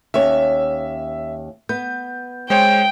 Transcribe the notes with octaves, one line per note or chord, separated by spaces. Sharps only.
D#2 C#4 C#5 E5
B3 G6
G#3 C5 C#5 G5